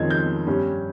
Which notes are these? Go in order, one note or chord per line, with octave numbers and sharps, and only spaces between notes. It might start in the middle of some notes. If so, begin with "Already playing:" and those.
Already playing: F2 D#3 G#3 C#4 G#6
G6
G2 G3 C#4